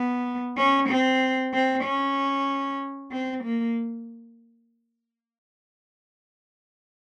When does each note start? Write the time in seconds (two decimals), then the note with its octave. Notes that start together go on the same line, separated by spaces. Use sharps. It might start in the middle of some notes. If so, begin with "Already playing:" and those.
Already playing: B3
0.57 C#4
0.89 C4
1.53 C4
1.84 C#4
3.11 C4
3.44 A#3